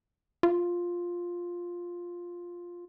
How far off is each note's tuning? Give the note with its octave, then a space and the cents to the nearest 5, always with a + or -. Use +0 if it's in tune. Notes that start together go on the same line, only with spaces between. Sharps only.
F4 +5